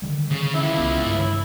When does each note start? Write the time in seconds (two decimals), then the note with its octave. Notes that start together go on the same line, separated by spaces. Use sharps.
0.02 D3 D#3 G3
0.31 C#3
0.55 C#2 C#3 E4
0.78 C2 B3
1.05 G2